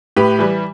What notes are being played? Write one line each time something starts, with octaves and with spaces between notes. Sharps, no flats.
A2 G4 B4
E3 G3